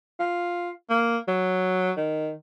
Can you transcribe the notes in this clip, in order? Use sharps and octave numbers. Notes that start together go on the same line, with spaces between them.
F4
A#3
F#3
D#3